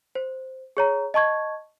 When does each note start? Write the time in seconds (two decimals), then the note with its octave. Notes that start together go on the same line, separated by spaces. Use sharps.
0.15 C5
0.77 G#4 C#5 A#5
1.14 D#5 A5 C#6 G#6